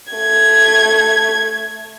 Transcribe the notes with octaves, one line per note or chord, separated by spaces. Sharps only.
A3 G#6